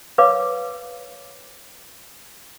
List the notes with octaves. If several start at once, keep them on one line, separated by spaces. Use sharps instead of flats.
A#4 B4 C#5 F5 D6